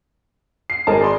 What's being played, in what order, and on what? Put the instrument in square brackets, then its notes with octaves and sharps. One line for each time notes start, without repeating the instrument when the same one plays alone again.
[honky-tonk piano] C7
[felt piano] G#1 G#4 A#4 [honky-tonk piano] D#4 A5
[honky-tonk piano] D5 B5 C6